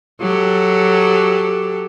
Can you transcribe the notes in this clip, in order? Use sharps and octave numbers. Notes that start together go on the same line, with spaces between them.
F#3 G4 A4